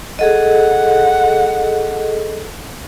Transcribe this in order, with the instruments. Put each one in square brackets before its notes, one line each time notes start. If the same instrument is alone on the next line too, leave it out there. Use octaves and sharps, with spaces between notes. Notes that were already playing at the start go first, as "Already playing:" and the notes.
[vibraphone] G#4 A4 D#5 [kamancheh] F#5